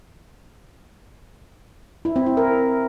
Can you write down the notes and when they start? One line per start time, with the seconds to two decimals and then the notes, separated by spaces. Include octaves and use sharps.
2.05 E4
2.16 C4
2.26 E4
2.37 A#4